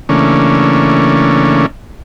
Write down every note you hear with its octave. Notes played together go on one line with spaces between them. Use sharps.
C#3 E3 A3 A#3 C#4 D4